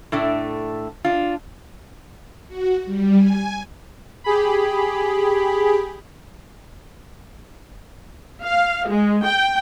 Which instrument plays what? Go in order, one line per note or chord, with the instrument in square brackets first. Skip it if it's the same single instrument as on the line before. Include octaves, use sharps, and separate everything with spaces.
[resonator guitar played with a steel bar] A2 A3 D4
D4 F4
[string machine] F#4
G3
G#5
[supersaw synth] G4 G#4 B5
[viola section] F5
G#3
G5